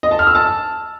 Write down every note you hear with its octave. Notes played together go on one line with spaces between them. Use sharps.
D#5
A5
F6
E6
A5